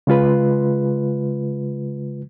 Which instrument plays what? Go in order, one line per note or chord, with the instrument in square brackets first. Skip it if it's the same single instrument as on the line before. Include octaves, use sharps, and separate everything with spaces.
[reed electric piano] C#3 G#3 F4 B4